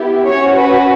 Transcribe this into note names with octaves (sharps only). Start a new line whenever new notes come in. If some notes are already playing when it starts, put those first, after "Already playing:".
Already playing: B3 E4 G4
C#4 F#4 C#5
B4